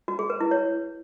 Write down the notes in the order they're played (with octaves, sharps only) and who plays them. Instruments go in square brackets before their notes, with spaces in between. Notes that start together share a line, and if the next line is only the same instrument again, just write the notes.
[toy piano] F#4
G#4
B4
E4
C#5